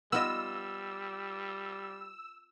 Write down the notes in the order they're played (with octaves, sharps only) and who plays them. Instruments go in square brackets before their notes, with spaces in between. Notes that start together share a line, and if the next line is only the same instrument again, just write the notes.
[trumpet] G3 [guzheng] B3 F4 D#5 [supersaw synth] E6